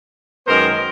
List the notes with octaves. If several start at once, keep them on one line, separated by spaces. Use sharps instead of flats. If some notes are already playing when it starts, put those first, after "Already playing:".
F#2 D#3 G#3 B3 A#4 C5